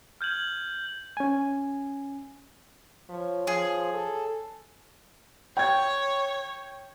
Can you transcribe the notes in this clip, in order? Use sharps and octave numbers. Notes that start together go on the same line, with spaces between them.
F6 G6 G#6 F#7
C#4 G#5
F3 B4 C#5
F3 G#4
A4
C#5 G5 G#6